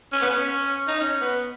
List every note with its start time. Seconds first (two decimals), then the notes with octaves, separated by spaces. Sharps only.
0.12 C#4
0.22 B3
0.30 C#4
0.88 D#4
1.00 C#4
1.21 B3